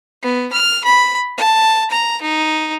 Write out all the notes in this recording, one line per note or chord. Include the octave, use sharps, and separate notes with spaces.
B3
F6
B5
A5
A#5
D#4